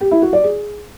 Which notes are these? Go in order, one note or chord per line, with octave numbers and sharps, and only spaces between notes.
G4
E4
F#4
D5
G#4